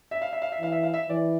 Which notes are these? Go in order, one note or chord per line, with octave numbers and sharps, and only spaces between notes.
E5
F5
E5
F5
E5
E3 F5
E5
F5
E5
E3 D5